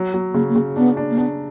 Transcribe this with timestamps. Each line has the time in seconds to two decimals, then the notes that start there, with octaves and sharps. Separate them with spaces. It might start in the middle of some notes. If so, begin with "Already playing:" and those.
Already playing: F#3
0.14 F#3
0.34 C#3 A#3
0.49 A#3
0.55 C#3
0.76 B3 D4
0.97 D4
1.10 A#3
1.18 B3 D4